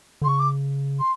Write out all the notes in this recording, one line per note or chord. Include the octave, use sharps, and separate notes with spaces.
D3 C6
C#3 C#6
D6
C6